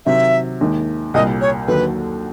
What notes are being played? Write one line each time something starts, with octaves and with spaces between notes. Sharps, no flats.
C3 D#3 F#3 E5
D#2 D#3 G#3
C2 A#2 G3 D#5
C#5
D#2 D3 F#3 B4